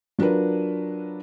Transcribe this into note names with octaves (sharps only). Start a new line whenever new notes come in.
F#3 D4 F4 A#4 B4